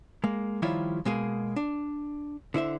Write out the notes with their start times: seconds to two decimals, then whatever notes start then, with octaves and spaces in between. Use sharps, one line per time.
0.24 G#3 A#3
0.62 D#3 F3 G3 E4 F4 C#5
1.05 B2 G#3 A#3 G#4
1.56 D4
2.54 D3 E4 C5 E5